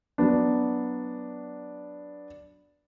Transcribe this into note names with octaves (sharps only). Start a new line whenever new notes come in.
F#3 B3 D4